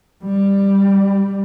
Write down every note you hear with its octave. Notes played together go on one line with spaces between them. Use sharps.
G3